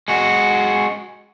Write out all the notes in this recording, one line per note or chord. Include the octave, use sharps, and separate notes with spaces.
G#3 F#4